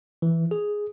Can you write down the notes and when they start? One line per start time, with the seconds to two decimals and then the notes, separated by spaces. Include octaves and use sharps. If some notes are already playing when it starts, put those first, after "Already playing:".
0.22 E3
0.51 G#4